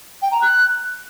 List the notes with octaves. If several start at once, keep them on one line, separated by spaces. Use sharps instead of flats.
G5
A#5
F#6